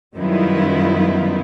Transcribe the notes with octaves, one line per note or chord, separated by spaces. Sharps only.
F#2 D#3 G3 B3 E4 F4